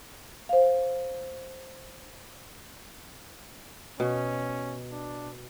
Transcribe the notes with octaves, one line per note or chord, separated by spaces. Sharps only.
C5 F5
B2 C#4
D4